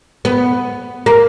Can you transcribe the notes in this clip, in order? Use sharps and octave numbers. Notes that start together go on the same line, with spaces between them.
B3
A#3